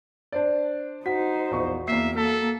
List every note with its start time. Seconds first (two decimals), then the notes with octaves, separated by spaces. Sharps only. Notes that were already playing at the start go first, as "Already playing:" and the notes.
0.32 D4 C5 D5
1.06 D#4 F#4 C5 F#5 B6
1.52 A#1 E2 C#6
1.88 E2 A#3 E5 C7
2.17 A#3 A4 B6